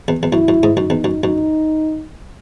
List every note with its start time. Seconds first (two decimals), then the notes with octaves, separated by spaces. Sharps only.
0.08 E2
0.23 E2
0.33 F#2 E4
0.48 F#2
0.63 G#2
0.77 F#2 D#4
0.90 E2
1.04 F#2
1.24 F#2 D#4